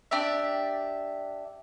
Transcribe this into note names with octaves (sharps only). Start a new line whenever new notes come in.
D4 G4 D5 E5